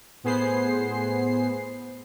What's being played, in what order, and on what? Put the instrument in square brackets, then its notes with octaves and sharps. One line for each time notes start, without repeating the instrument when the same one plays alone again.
[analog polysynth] A2 B3 G#4 C5 C7